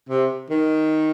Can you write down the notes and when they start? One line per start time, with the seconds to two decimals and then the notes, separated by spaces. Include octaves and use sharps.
0.09 C3
0.50 D#3